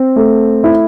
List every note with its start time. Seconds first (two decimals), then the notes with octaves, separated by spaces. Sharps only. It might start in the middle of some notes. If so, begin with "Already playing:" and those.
Already playing: C4
0.16 A3
0.64 E4